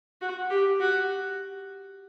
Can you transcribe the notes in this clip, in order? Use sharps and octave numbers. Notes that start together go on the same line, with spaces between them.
F#4
G4
F#4